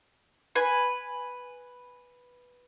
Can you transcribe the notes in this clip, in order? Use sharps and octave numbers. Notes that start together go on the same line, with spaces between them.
B4 G#5